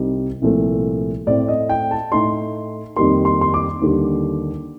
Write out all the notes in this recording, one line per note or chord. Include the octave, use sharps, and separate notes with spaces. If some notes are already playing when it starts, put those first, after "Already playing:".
Already playing: C2 C3 G3 C4 D#4
C2 A#2 F3 A3
A2 A3 C4 D5
D#5
G5
A5
A2 A3 D#4 C6
F2 D#3 G3 A#3 C6
C6
C6
D6
D#2 D3 G3